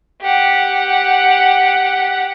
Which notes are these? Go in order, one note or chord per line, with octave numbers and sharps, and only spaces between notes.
G4 F#5